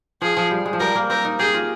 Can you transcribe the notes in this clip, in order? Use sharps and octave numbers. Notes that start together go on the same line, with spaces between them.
F3 G#4
F3
G3
G#3
F3
G3 A#4
A#3
C4 A#4
D#4
G4 G#4
F4